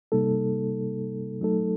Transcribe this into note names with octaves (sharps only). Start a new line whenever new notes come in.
C3 G3 A#3 D#4 A4
F#3 A3 D#4 A4